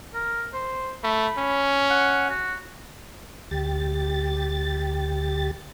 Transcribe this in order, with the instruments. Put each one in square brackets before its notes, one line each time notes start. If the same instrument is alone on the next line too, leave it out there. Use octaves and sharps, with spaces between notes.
[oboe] A#4
C5
[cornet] A3 [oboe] B5
[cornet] C#4
[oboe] F#5
F#4
[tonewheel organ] D2 G4 A6